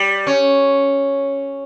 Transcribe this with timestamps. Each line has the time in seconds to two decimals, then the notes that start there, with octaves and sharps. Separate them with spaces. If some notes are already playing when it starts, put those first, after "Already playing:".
Already playing: G3
0.27 C#4